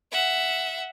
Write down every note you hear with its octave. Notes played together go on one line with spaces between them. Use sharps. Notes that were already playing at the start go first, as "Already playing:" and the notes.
E5 F#5